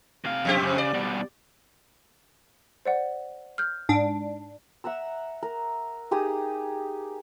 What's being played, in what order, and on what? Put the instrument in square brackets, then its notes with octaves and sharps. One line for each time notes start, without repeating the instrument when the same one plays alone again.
[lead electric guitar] C3 F5
[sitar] F2 C4 G4
[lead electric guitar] C#3
[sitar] D5
[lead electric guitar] B2 G3
[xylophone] C5 D5 F#5
F6 G6
[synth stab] G#2 D4
[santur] E5 F#5 A#5 E6
A#4
D#4 G4 G#4 D#6